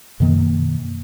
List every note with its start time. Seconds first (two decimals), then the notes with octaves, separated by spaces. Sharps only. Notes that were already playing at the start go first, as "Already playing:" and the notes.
0.20 F#2 B2 D#3 A#3